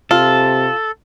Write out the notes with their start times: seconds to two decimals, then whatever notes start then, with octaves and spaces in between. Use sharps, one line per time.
0.11 C3 F4 A4